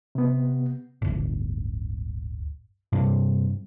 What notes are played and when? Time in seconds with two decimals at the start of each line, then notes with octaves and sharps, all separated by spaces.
0.15 C3 B3
1.02 D1 G1
2.93 G2 C3